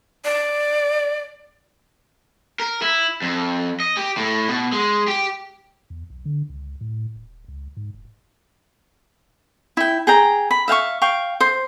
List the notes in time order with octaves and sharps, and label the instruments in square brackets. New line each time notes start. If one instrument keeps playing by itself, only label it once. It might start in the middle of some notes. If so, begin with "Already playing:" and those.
[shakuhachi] D5
[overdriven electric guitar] A#4
E4
F2
D#5
G4
A2
B2
G#3
G4
[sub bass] E2
B1
D3
C#2
A2
D#1
C#2
G#2
E1
[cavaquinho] E4 G5
G#4 G5 A#5
B5
E5 F5 G5 C#6
F5 G5 C#6
C5